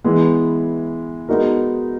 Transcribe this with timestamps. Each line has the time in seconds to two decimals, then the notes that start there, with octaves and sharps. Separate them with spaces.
0.04 E3 G#3 B3
1.29 G#3 B3 D#4 F#4 A#4